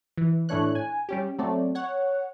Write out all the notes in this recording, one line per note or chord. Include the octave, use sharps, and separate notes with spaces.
E3
A2 E3 A3 D4 C#5 F#6
G#5
G3 C#4 G4
F#3 A3 C4 D5
C#5 F#5